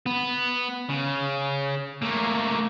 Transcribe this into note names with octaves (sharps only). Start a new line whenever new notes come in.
B3
C#3
A3 A#3